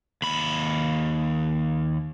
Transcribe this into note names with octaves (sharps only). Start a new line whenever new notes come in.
D#2 B5